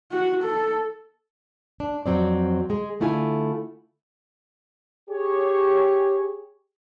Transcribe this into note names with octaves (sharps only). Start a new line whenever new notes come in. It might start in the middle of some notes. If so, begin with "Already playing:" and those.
F#4
A4
D4
F2 G#2 F#3 C4 D5
G#3 G#4
D3 A3 E4 F4 F5 G#5
G4 G#4 C#5